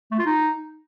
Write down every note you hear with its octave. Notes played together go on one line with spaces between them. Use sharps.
A3
F4
D#4